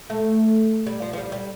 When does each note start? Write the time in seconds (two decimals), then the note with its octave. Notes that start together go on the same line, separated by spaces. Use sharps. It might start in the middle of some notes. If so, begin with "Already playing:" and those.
0.10 A3
0.87 G3
1.02 F3
1.13 F3
1.18 G3
1.32 G3